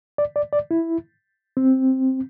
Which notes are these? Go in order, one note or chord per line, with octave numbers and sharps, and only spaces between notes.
D5
D5
D5
E4
C4